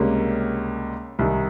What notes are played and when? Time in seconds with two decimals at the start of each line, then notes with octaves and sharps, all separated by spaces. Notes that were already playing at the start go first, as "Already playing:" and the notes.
Already playing: C#2 C3 G3 A#3 C#4
1.19 C2 C3 D#3